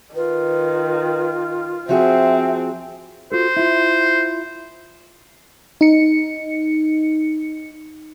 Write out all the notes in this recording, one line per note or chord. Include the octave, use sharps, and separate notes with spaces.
D#3 F4 B4
F3 C4 F#4 G#4 E5
F4 F#4 A4 C5
E4 F4
D#4 C#7